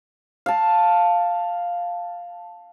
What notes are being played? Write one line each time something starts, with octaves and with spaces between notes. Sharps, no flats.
F5 A5